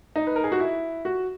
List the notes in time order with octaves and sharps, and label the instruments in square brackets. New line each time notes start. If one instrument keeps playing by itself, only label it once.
[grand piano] D#4
B4
A#4
G#4
F#4
E4
F#4